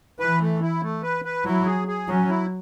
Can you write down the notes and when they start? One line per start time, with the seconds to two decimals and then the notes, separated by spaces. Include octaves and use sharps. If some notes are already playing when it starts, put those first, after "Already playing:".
0.19 E3 B4
0.41 A3
0.62 E4
0.83 A3
1.03 B4
1.25 B4
1.45 F#3 E4
1.66 G#4
1.88 G#4
2.08 F#3 C#4
2.29 E4